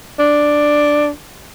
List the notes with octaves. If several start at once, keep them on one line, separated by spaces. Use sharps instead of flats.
D4